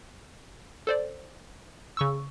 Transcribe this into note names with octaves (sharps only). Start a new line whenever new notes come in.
A4 C5 D5
C#3 C#6 E6